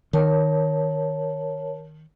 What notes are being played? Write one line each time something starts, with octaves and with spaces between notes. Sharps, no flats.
D#3 A#4 C#5 A5